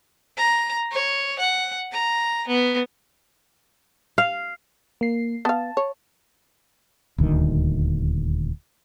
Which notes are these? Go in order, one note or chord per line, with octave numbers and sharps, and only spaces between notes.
A#5
C#5
F#5
A#5
B3
F5
A#3 C7
B3 F5 A5
C#5
D#1 D2 D#3